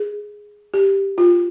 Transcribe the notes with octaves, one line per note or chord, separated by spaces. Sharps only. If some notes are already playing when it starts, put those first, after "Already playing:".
Already playing: G#4
G4
F4